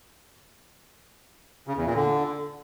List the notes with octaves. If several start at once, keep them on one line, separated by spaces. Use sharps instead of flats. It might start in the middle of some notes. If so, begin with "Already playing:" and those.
C#3
E2
A#2
D3